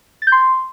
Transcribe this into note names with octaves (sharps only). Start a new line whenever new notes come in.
A6
G6
C6